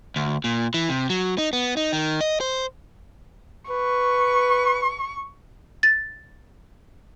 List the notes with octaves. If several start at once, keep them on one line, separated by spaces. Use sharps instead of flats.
D2
A#2
E3
C3
F#3
D#4
B3
D#4
D#3
D#5
C5
B4 C#6
A6